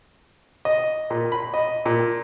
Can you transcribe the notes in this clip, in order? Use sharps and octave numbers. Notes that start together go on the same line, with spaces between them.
D#5
A#2
B5
D#5
A#2